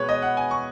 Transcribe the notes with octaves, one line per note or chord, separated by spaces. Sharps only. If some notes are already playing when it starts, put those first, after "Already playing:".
Already playing: B2 G#3 B4 C#5
D#5
F#5
G#5
C#6